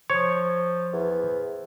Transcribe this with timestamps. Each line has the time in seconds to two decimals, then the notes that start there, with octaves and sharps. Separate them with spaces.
0.10 F3 C5 C#5
0.93 E2